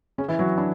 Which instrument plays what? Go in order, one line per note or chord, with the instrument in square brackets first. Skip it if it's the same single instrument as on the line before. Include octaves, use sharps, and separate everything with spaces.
[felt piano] C#3 C#4
E3 E4
F#3 F#4
D4